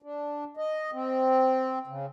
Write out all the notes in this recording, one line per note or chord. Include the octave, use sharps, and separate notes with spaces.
D4
D#5
C4
C#3